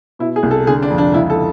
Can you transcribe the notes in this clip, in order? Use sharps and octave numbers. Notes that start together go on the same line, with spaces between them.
B2 E4
G#4
C2
A4
D3 G#4
D4
F2
D4
C#2 E4
A4